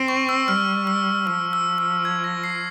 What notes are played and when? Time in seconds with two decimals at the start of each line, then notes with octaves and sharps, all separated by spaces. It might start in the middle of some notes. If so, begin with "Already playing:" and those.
Already playing: C4
0.08 C#6
0.29 E6
0.48 G3 F6
0.87 E6
1.26 F3 E6
1.53 E6
1.78 E6
2.05 G#6
2.24 A#6
2.44 C7